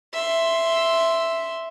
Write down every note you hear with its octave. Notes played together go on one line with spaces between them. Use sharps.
E5 C6